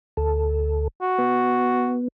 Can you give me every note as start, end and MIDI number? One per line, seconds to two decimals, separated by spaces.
0.17 0.87 38
0.17 0.87 69
1.02 1.96 66
1.18 2.08 59